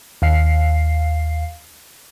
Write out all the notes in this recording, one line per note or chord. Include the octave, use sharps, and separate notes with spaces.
D#2 F5 C7